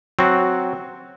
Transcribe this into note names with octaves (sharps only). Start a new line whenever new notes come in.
F#3 C4 F#4